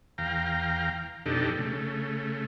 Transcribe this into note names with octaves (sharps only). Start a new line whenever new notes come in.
E2 F5 G5 A#5
F2 B2 D4 D#4 G4 A4
C#3 A3